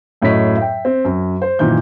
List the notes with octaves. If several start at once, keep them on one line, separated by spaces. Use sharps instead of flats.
F#2 A2 F#3 C#5 D#5 B6
E5 G5
C4
F#2
C5
F#2 A#2 D#3 E3 G6